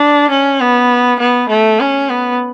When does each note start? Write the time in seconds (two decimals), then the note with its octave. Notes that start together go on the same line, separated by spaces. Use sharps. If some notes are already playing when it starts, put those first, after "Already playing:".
Already playing: D4
0.30 C#4
0.60 B3
1.19 B3
1.49 A3
1.80 C#4
2.10 B3